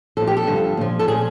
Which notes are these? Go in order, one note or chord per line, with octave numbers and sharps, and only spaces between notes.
A#2 F3 A4
G4
A4
G2 D3 F3
A#2 F3
A4
A#2 F3 G#4